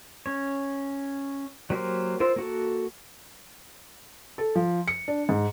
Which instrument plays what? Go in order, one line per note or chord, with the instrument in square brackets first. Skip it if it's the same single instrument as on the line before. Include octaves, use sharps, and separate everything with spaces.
[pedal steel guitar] C#4 C#5
F#3 A#3 G4 A#4 C5
F4 A#4 C5 C6 E6
A#3 F#4 A4
[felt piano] A4
F3
C#7
D4
G#2